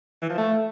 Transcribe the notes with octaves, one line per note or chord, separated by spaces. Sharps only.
E3
F3
A3